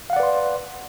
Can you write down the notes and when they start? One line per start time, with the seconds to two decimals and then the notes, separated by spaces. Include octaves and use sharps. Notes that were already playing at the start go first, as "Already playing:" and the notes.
0.10 F5
0.13 F#5
0.16 D5
0.20 B4
0.23 C6